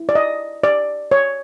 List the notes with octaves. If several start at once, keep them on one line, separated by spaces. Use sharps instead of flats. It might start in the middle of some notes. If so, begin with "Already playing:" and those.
Already playing: E4
D5
D#5
D5
C#5